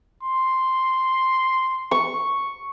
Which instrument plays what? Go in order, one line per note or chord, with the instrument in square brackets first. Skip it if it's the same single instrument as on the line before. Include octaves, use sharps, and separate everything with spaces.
[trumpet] C6
[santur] C#6